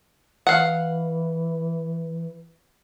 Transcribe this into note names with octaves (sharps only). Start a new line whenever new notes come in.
E3 F5 F#5